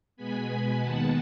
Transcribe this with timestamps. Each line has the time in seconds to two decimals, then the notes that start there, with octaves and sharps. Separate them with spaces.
0.17 B2 G#3 B3 G#5 B5
0.80 D#2 D#3 G#3 B3 F#5 A5